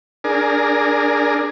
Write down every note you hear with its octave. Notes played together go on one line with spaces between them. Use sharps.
D4 G#4 A#4